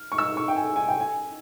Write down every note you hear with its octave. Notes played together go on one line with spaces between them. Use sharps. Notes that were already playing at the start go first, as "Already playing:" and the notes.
Already playing: F6
C#6
E6
C#6
G5
G#5
G#5
G5
G#5